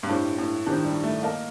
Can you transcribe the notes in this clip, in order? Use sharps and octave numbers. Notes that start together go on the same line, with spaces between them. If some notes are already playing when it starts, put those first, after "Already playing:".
G2
A2 D4 G4 C5
A2
D#3 D4 G4 C5
G3
A3
A#3 A#4 D#5 A5